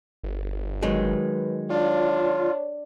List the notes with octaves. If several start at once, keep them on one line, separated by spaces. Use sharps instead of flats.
G1
D#3 F#3 G#3 B4
D4 F4 C#5